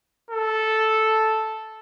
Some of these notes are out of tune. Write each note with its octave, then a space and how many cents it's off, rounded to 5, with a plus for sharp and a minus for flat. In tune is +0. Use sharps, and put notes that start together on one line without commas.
A4 -5